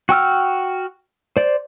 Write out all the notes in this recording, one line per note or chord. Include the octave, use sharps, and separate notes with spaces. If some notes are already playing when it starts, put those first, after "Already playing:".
F#4 G5 E6 F6
C5 D5